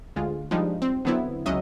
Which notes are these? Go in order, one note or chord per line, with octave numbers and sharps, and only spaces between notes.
D2 G#3 F4
F3 G3 G#3 D4 D#4
C4
D3 F#3 B3 C4 E4
C#2 F#3 C#4 D#5 E5